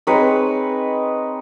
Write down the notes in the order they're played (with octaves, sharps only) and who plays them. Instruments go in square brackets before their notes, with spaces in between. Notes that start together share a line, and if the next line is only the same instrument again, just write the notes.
[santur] G#3 C4 D#4 B4 C#5